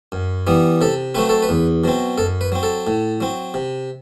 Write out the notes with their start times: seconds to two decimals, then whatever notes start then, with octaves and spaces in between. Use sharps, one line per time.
0.12 F#2
0.47 E3 G3 B3
0.81 C3 A4
1.15 F#3 A3 C4 B4
1.29 A4
1.43 B4
1.49 E2
1.84 B2 F#3 C4
2.18 F#2 A4
2.41 B4
2.52 F#3 C4
2.63 A4
2.87 A2
3.21 F#3 C4
3.54 C3